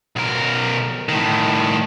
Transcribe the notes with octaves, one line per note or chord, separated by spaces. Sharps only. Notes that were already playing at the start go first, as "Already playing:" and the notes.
B1 A#4
A2 D#3